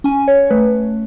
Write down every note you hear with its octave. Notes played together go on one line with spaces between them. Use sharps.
C#4 G#5
C#5
A3 B4